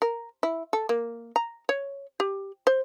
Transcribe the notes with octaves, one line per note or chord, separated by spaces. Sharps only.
A#4
E4
A4
A#3
A#5
C#5
G4
C5